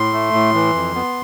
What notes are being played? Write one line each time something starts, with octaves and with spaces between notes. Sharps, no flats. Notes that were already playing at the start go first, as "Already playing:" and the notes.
Already playing: A2 C6
A3
A2
E3
F2
B3